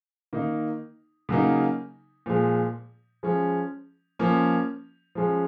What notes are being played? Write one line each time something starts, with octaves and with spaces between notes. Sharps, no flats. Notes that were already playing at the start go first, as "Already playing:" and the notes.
D#3 A#3 D#4
C#3 F#3 A#3 D#4
A#2 F3 G#3
F3 G#3 C#4
F3 A#3 C#4
F3 G#3 C#4